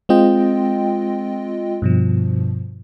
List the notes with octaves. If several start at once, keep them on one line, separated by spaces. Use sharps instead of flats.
G#3 C4 F4 D#5 G5
G2 B2 F3